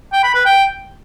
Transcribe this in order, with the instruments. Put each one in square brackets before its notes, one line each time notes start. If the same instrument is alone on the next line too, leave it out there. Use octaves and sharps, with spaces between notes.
[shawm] G5
B5
B4
G5